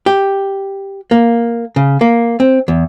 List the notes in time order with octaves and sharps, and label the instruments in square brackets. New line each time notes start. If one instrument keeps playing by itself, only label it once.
[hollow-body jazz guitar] G4
A#3
C#3
A#3
C4
E2